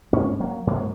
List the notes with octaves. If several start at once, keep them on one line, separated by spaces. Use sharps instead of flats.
G#2 A#3 C#4
F#3 A#3
G#2 F#3 A#3